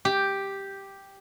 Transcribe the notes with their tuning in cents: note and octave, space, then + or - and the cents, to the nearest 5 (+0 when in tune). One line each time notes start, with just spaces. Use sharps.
G4 +0